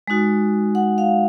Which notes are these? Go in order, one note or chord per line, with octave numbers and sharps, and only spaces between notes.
G#3 D#4 F#4
F#5
F5